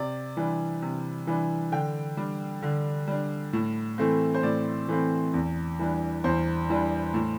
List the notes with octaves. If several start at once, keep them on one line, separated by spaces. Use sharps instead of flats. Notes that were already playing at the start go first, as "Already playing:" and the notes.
Already playing: C3 D5
E3 G3 D4
C3
E3 G3 D4
D3 G5
G3 D4
D3
G3 D4
A2
E3 A3 C4
C5
A2 D5
E3 A3 C4
E2
E3 G3 D4
E2 C5
E3 G3 D4
A2